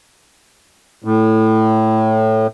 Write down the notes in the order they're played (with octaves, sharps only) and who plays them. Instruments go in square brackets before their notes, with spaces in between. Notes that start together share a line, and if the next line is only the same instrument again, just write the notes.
[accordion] A2